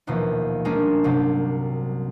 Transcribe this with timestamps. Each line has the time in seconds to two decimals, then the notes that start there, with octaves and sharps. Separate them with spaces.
0.07 A#1 D#2 B2 E3 F3
0.65 G3 G#3 A#3 C#4 D4 G#4
1.04 C2 G2 C3 F#3